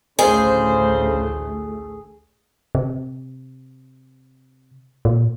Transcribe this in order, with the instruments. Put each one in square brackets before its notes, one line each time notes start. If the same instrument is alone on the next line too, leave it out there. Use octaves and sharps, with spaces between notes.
[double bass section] A1 D2 A3 [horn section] C#3 C5 [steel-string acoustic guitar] G#4
[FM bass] C3
A#2